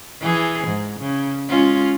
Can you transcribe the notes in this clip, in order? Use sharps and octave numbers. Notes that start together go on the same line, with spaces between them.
E3 G#4
G#2
C#3
G#3 C#4 F4